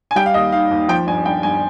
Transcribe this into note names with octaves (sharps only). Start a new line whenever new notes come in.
G#5
G3 G5
F5
D#2 D#5
D#3 F5
D#2
F3 G5
G1 G#5
G2 G5
G1 G#5